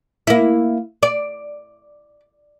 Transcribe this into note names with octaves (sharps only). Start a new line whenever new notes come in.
A#3 E4
D5